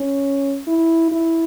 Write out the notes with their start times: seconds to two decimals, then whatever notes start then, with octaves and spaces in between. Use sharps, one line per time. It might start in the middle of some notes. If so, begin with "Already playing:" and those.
Already playing: C#4
0.68 E4
1.12 E4